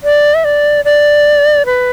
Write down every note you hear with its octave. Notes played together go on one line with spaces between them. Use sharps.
D5
E5
D5
D5
B4